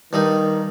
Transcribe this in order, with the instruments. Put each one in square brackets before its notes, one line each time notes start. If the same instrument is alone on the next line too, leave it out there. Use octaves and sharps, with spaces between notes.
[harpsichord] G2 G3 D#4 [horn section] D#3